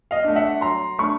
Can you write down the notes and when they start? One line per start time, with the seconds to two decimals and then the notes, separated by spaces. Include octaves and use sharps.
0.11 D#5 F5
0.24 A3 D4
0.36 E5 F#5
0.61 F#3 A#5 C6
0.99 A3 D4 B5 C#6